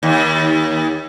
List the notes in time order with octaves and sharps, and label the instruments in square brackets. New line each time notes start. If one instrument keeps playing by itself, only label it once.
[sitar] D#2